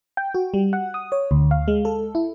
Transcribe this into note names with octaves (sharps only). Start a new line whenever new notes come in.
G5
F#4
G3
F#5
D#6
C#5
D2
F5
G#3
A4
E4